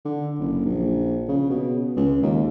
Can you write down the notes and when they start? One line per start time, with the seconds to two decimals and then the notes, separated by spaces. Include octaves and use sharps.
0.05 D3
0.39 F#1
0.65 A#1
1.28 C#3
1.50 B2
1.96 C#2
2.22 D#2